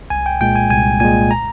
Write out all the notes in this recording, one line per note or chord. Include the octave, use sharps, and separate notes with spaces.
C2 G#5
G5
A#2 G#3 G5
G#5
C2 G#5
A#2 G#3 G#5
A#5